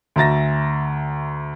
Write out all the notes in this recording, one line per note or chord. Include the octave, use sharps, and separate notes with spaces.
D2 E5 A#5 A6 A#6